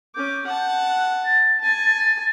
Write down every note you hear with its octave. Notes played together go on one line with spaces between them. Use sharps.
C#4 D6 G6
F#5 A5
F#6
A6
G#5 A5